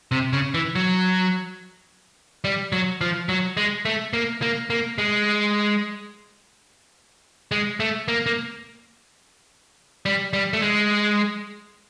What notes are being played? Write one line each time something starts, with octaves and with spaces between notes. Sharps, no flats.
C3
C#3
E3
F#3
G3
F#3
F3
F#3
G#3
A3
A#3
A#3
A#3
G#3
G#3
A3
A#3
A#3
G3
G3
A3
G#3